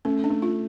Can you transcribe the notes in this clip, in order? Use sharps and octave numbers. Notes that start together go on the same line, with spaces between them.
A3 C#4
D4
A3
F4